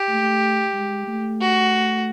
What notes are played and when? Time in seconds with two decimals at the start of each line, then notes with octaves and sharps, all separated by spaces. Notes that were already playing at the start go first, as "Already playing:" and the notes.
Already playing: G4
0.09 A3
0.74 G#3
1.08 A3
1.41 F#4